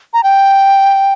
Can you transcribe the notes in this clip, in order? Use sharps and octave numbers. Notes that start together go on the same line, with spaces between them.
A#5
G5